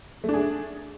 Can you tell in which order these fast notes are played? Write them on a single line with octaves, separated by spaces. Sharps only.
A3 D4 G#4